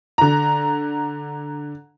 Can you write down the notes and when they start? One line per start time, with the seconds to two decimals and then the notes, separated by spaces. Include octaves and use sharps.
0.18 D3 A#5